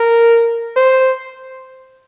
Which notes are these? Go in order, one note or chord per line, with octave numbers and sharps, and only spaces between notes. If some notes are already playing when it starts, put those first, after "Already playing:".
Already playing: A#4
C5